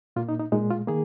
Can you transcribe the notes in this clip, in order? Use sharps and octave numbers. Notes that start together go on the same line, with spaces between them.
A#2 A#3 F4
D#4
D#4
A#2 G#3 D#4
F4
D#3 A#3 G#4